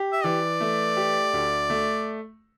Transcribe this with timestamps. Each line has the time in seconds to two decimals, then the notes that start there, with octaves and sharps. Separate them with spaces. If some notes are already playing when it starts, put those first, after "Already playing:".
Already playing: G4
0.12 E5
0.24 E3 D5
0.60 A3
0.97 G4
1.34 D2
1.70 A3